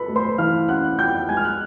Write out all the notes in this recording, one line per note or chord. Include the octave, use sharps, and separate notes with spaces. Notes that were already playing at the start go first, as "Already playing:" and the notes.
Already playing: F4 A4 B4 A5 B5
A3
C5 C6
E3 F5 F6
C#4 F#5 F#6
F4 G5 G6
G#3 G#5 G#6
F6
F#6